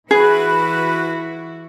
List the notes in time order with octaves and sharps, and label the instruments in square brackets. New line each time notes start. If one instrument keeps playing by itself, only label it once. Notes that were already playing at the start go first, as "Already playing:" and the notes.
[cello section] E3 E4 F#4 [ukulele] G#4 [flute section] B4